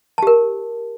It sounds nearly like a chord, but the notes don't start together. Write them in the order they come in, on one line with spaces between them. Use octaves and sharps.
A5 G4 A#4